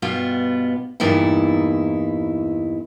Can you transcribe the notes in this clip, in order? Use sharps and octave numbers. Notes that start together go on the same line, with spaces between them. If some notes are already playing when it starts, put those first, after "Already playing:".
G2 B2 B3 F4
E2 G2 A#2 D#4 E4